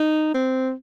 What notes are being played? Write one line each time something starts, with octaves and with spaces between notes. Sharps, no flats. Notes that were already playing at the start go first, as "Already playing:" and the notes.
Already playing: D#4
C4